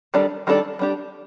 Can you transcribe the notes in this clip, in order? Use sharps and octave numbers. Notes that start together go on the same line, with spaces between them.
D#3 G3 D4 A4 D5
D#3 G3 D4 A4 D5
G3 D4 G4